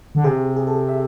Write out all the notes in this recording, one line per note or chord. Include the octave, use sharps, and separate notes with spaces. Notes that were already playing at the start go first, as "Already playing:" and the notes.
D3
C3 G#4
G#4
A4
E5